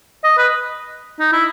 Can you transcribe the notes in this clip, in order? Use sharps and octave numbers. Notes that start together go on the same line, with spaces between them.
D#5
B4
D#4
E4